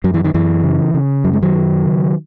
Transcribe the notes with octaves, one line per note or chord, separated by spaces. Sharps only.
F#2 F#3
E3
D#3
F#2 E3
C#3
C#3
F#2 F#3
G#3
D#3 F#3
F#2
C#3